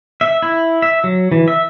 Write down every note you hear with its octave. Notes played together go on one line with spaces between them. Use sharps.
E5
E4
E5
F#3
E3
E5